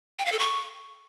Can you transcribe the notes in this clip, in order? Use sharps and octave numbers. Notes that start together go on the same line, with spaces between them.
G5
F5
A4
C#6